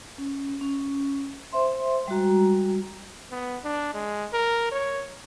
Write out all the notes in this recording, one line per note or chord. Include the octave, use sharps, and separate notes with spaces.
C#4
C#4
C5 E5 C6
G3 G#3 F#4 A#5
B3
D4
G#3
A#4
C#5